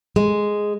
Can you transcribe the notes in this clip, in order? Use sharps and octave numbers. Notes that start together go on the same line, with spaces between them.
G#3